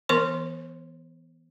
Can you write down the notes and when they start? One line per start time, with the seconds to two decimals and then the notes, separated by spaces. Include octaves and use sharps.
0.09 E3 B3 A#4 C5 C6 C#6